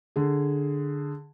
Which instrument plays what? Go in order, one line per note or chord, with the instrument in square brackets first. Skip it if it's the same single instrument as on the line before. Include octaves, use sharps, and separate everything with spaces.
[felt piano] D3 G#4